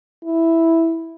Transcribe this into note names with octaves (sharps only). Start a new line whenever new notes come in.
E4